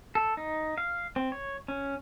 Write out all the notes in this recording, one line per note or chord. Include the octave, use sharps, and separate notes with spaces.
A4
D#4
F5
C4
C#5
C#4